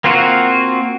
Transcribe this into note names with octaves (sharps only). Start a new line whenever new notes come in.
A#3 C4 F4 F#4